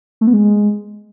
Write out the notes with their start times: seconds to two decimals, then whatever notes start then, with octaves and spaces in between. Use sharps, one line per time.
0.21 A3
0.27 B3
0.33 G#3